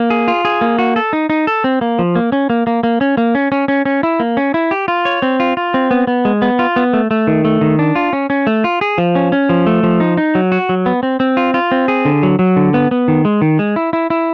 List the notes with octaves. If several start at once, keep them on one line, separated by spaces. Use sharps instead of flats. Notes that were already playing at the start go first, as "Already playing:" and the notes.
Already playing: A#3
G#4
F4
G#4
A#3
F#4
A4
D#4
D#4
A4
C4
A#3
F3
A#3
C#4
A#3
A#3
A#3
C#4
A#3
C#4
C#4
C#4
C#4
E4
A#3
C#4
E4
G4
F4
C#5
C4
F4
F4
C4
B3
B3
G#3
B3
F4
B3
A3
A3
D#3
A3
D#3
D4
F4
C#4
C#4
A3
F4
G#4
F3
C#4
C#4
F3
A3
F3
D#4
D#4
F#3
F#4
F#3
B3
C4
C4
F4
F4
C4
G#4
D3
F#3
F#3
D3
B3
B3
D#3
G#3
D#3
G#3
E4
E4
E4